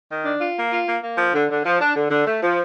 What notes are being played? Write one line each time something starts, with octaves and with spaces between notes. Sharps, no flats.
D#3
D4
F4
A#3
F4
A#3
A#3
F3
D3
D3
F3
D4
D3
D3
A3
F3